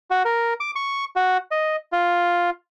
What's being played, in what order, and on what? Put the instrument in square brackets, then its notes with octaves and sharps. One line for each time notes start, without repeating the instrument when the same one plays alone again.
[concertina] F#4
A#4
D6
C#6
F#4
D#5
F4